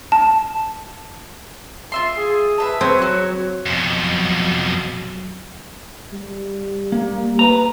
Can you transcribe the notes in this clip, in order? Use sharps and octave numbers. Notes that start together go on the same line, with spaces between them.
A5
F4 E5 C6
G#4
B4 E5 A5
C4 B4 C#5 D#6
F#3 F#4 C#5
F2 B2
F#3
G3
A#3
B4 A#5